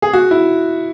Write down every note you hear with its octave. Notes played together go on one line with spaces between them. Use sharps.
G#4
F#4
E4